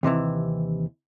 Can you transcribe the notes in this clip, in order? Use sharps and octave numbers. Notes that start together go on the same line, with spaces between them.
D#2 C3 D#3 E3